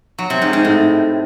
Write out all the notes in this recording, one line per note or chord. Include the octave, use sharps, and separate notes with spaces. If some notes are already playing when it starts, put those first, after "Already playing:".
F#3
C3
G#2
G#2
A2